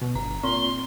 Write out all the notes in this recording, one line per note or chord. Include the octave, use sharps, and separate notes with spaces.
B2
G1 A#5
A#2 C4 C6